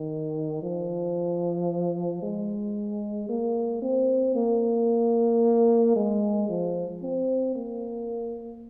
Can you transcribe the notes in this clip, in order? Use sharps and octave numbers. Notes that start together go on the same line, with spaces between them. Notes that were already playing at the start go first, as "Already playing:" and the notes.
Already playing: D#3
F3
G#3
A#3
C4
A#3
G#3
F3
C4
A#3